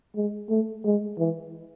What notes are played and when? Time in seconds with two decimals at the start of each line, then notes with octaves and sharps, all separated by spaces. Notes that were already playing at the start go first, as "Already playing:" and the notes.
0.16 G#3
0.49 A3
0.85 G#3
1.19 E3